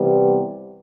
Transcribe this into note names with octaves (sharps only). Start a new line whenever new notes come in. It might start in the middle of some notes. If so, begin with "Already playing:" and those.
Already playing: C3 E3 G3 B3